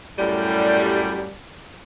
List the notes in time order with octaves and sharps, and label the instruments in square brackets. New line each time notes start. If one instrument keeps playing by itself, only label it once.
[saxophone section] F#2 A2 G3